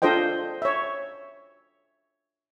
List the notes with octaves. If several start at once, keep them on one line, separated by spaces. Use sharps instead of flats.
D4 F4 A4 C5 D#5 G5
C#5 E5